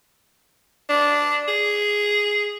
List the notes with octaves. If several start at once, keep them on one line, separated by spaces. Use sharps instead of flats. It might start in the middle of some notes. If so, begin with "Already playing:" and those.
D4
G#4